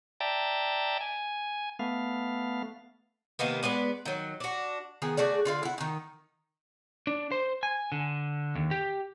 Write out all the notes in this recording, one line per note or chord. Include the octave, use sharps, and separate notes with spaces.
D5 E5 G5 A5 A#5
G#5
A3 B3 F5
C3 D#3 A#3 B3
G#3 B3 B4 D5
D#3 F#3
D4 F#4
D#3 B3 G#4
A3 F#4 G#4 D5
D3 F4 F5
E4 F#5
D#3 D#4
D4
C5
G#5
D3
D#2
G4